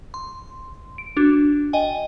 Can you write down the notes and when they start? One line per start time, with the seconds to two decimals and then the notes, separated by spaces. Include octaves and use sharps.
0.14 C6
0.98 D7
1.17 D4 F#4
1.73 D#5 G5 G#5